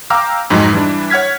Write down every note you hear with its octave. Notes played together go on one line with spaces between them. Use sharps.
F5 G5 A#5 D6 E6 F6
F2 G#2 F#3 D#4
E3 G3 D4
C#5 F#5 F6 G#6 B6